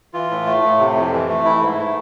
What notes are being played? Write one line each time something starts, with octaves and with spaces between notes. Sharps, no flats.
E3 F4
A2
A3
A2
C3
F2
E3
A3
E3 E4
G#2
A3